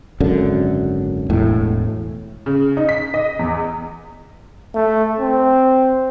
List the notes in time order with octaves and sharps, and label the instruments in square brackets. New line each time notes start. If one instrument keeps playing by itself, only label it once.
[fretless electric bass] G#1 F#2 D3
E1 A2
[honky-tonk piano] C#3
D#4
B6
D#5
E2
[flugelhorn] A3
C4